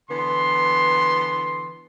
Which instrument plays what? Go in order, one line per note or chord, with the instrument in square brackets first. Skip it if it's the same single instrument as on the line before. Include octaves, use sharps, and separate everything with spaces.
[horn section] D3 E3 B3 C6